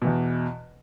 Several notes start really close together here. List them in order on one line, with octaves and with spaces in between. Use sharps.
B2 E3 E2